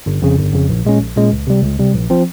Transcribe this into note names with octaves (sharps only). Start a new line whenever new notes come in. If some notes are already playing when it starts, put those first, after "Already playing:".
G1
F2 C#3
G1
F2 C#3
A#1
A#2 G#3 C#4
A#1
A#2 G#3 C#4
C#2
C3 G3
C#2
C3 G3
A#1
F3 C4